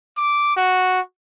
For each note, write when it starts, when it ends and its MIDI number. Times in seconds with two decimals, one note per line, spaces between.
0.17 0.52 86
0.56 1.00 66